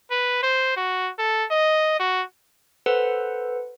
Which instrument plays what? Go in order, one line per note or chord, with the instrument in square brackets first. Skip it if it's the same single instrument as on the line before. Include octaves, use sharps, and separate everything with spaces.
[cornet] B4
C5
F#4
A4
D#5
F#4
[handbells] A4 B4 C5 F#5